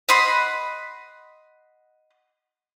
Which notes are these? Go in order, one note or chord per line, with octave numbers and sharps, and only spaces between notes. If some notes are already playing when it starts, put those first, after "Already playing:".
D#5 F#5 B5 C6